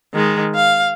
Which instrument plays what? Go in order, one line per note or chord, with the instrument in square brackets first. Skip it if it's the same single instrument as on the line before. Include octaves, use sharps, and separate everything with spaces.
[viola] D#3 G#3
F5